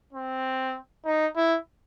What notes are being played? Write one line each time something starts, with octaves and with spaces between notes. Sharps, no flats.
C4
D#4
E4